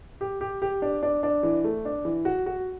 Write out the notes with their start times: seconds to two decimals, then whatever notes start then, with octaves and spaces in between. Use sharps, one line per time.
0.21 G4
0.41 G4
0.62 G4
0.82 D4
1.03 D4
1.23 D4
1.43 E3
1.64 A3
1.85 D4
2.05 E3
2.25 F#4
2.46 F#4